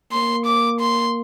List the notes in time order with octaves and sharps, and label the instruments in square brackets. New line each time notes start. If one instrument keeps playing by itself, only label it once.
[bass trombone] A#3 [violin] C6
[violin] D6
C6